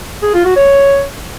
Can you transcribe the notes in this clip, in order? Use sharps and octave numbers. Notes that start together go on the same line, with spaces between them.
G#4
F4
F#4
C#5